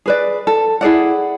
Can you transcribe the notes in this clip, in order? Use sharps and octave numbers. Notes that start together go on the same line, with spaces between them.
G#4 B4 D5
A4
E4 G#4 D5 F#5